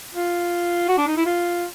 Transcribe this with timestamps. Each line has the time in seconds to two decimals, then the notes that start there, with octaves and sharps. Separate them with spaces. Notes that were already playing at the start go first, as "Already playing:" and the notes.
0.14 F4
0.88 F#4
0.98 D4
1.07 D#4
1.17 E4
1.26 F4